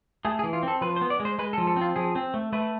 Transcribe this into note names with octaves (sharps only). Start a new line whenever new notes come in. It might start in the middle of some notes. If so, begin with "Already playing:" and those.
A3 G#4
G#4
E3
F4
C4 A4
F3 B4
C5
B3
D5
G#3
C5
G#3 B4
A4
F3
A4
C4 F4
F3 G#4
C4
A3
A3 B4